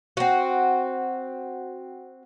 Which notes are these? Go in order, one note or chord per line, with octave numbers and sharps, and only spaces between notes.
C4 F#4